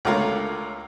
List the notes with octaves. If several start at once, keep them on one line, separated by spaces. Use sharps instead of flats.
C#2 D3 A3 F4 A#4 C#5